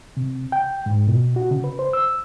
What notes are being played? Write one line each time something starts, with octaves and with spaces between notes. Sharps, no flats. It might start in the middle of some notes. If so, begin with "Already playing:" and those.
C3
G5
G#2
B2
F#4
C#3
B4
C5
E6